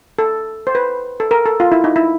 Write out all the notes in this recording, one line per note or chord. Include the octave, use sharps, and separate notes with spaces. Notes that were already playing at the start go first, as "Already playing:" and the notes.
A4
C5
B4
A4
A#4
A4
F4
E4
D#4
E4